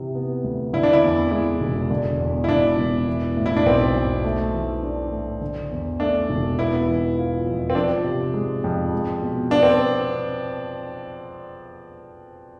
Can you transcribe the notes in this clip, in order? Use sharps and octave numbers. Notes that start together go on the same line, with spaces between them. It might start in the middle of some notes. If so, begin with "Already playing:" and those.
Already playing: C3 E3
B3
D2
D3 E4
D4
E4
E2
G#3 E4
E1
D3
E2
E4
E1 D4
E1
E3
A2
E4
D4
B1 C4
B1
A3
E3
D4
A2
D3
E2
A3 D4
E1
B3 E4
E3
F4
F2
C4
F3 D4
C3
G#3
F2
G#3
B2
B3 D4
C4